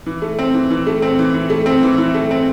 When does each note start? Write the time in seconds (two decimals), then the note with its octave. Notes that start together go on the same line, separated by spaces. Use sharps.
0.06 E3
0.22 A3
0.39 C4
0.54 E3
0.70 E3
0.87 A3
1.02 C4
1.19 E3
1.34 E3
1.50 A3
1.66 C4
1.83 E3
1.98 E3
2.14 A3
2.31 C4